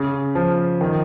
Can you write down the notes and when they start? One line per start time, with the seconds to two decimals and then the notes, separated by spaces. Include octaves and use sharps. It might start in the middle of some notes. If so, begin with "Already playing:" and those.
Already playing: C#3
0.35 F3
0.81 D#3